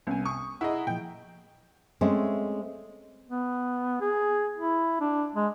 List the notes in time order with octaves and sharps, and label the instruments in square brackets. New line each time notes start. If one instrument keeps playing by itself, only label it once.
[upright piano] C2 G#5 [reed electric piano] G3 B3 C#4
[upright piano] C#6 [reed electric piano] D#6
[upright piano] E4 G#4 D#5 [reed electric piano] F#5 A#5
[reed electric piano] A#2 F3 [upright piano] G5
[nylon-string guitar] G#3 A3 C4 C#4
[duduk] B3
G#4
E4
D4
G#3